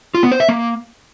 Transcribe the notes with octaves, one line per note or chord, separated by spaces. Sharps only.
F4
B3
C5
E5
A#3